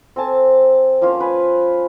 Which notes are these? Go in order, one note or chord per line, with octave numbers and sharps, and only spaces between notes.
C4 A4 G#5 A5
F3 A#3 C#4 F4
B4 G#5